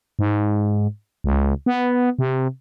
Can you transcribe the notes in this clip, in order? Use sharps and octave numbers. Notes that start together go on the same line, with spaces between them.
G#2
C#2
B3
C3